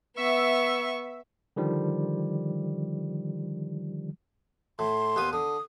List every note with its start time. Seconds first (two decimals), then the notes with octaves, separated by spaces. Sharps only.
0.17 B3 E5 C#6
1.56 D3 D#3 F3 G3
4.79 A2 C6
5.16 D#2 B3 D#6
5.33 D3 D#6